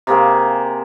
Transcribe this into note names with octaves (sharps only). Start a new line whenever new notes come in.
C3 A#3 G#4 C5